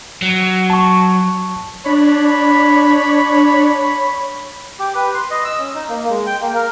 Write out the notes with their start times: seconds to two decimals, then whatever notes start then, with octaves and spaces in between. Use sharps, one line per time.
0.22 F#3
0.70 A5 C#6
1.86 D4 C#5 B5
4.79 G4
4.95 B4
5.15 C6
5.31 D#5
5.45 E6
5.59 C#4
5.75 D#4
5.89 A#3
6.10 G#3
6.26 G5
6.41 A#3
6.55 A#4